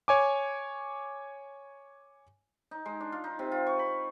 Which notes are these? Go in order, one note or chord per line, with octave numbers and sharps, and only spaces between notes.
C#5 G#5 D6
D#4
G#3
D4
F4
D#4
C3
F4
C#6
B5